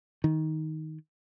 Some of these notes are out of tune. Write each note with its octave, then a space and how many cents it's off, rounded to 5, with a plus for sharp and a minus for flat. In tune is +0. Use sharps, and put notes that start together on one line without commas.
D#3 +10